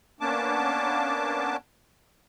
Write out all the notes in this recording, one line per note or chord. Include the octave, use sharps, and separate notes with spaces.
A#3 B3 C#4 D4 A5 D6